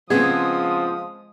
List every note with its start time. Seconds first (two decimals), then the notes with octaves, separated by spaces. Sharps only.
0.10 C#3 F3 G#3 B3 C4 G#4 D#6